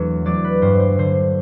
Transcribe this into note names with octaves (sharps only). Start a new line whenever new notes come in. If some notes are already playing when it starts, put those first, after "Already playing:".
Already playing: E2 D3 F#3 A3
F#3 D5
B4
G2 C5
C5
D3 C5